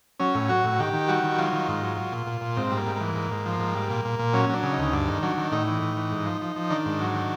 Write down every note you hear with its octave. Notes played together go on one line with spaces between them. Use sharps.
F#3 C#4
A2
F#3 F#4
A2
D#3 G4
D#3
G3 F#4
D#3
F#3 F4
D#3
G#2
F#3
F#3
A#2
A#2
A#2
G#2 C4
G3
A#3
G#2
E3 A#3
G#2
G#2
F3
G#2
G3
A#2
A#2
A#2
F#3 C#4
F#3 D4
C#3
D#4
D2
G2 D4
D#3
F#3 D4
D#3
A2 D#4
E3
A2
E3
G#2
F3
F3
F3
D#3 D4
G#2
F#3
D#3